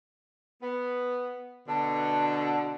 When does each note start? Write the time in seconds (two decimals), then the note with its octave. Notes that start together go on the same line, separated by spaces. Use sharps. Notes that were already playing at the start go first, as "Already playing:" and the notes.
0.63 B3
1.68 B2 D3 A5